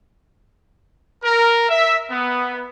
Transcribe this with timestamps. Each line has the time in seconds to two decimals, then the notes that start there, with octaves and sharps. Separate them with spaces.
1.23 A#4
1.69 E5
2.11 B3